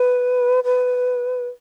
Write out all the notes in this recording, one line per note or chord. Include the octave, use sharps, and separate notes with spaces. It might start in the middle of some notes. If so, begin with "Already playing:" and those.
Already playing: B4
B4